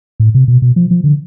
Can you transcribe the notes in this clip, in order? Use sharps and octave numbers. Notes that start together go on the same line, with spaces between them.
A2
C3
B2
B2
F3
F3
D3